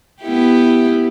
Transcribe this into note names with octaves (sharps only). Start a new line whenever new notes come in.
B3 E4 G4